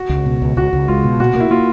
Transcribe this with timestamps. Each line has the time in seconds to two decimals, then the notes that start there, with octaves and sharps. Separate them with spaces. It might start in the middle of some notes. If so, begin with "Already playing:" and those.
Already playing: F#4
0.09 C#2
0.26 B2
0.42 C#2
0.57 C#2 F#4
0.73 C#2
0.88 G#3 F4
1.04 B2
1.20 A#2 F#4
1.35 A#3
1.40 E4
1.50 A#3 F4